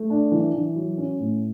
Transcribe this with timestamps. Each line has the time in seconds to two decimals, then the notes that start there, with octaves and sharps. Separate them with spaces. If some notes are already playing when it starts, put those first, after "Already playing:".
Already playing: A3
0.10 D4
0.32 E3
0.54 E3
0.76 F#3
0.98 C#4
1.19 A2